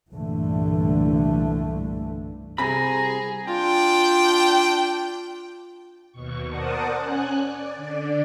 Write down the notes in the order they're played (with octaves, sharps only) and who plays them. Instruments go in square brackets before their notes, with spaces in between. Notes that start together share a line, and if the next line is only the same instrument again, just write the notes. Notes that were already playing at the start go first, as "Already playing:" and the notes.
[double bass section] C2 G2 A#2 D3 E3 A3
[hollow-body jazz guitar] C2 C3 B5 [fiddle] G#4 [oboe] A#5
[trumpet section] D4 G5 [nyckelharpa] F4
[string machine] D#2 B2 C#6
A#4 C5 D5 F#5 A5 D#6
C#4 G#5 F#6
D5
D3 D5